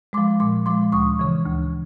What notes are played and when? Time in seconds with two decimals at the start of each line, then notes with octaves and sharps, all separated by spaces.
0.13 F3 G#3 C6 D6
0.40 A#2 C6 D6
0.66 F3 G#3 C6 D6
0.92 D2 C#6 D#6
1.19 C#3 E3
1.46 D2